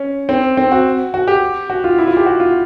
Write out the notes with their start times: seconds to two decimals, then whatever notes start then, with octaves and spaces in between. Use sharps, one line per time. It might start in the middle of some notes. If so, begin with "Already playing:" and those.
Already playing: C#4
0.29 C4
0.57 C4
0.72 F#4
1.14 F#4
1.28 G4
1.70 F#4
1.84 F4
1.98 E4
2.07 F4
2.17 G4
2.26 F#4
2.40 F4